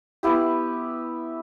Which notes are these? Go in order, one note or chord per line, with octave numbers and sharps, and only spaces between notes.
B3 E4 G4